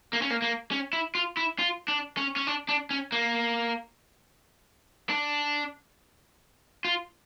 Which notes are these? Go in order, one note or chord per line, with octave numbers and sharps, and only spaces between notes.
A#3
C#4
A#3
A#3
C#4
E4
F4
E4
F4
D4
C#4
C#4
D4
D4
C#4
A#3
D4
F4